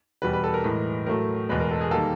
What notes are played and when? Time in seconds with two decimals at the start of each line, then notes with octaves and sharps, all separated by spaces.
0.22 E2 B2 G3 B4
0.33 B4
0.44 A4
0.54 A#4
0.64 A2 E3 G#3
1.06 A2 F#3 A3 A#4
1.49 E2 B2 G#3 B4
1.60 A#4
1.71 A4
1.81 G#4
1.91 D#3 G3 A#3 A4